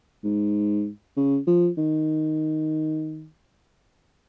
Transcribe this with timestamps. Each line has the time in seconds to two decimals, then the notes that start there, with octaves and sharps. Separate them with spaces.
0.24 G#2
1.17 C#3
1.47 F3
1.77 D#3